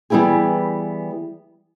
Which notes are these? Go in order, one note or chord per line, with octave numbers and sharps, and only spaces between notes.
E3 G3 B3 E4 G4 G#4